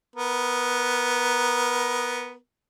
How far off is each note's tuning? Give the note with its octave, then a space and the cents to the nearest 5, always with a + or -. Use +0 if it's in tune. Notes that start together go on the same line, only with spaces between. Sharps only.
B3 +0 A#4 +20